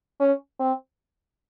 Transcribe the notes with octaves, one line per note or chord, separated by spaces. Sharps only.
C#4
C4